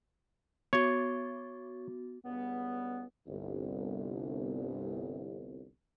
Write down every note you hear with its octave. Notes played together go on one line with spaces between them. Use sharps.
B3 F#4 C#5
C#2 G2 C#3 G3 B3
G1 C2